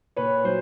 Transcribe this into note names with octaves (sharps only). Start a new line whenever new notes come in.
A#2 B4 C#5
F#3 C5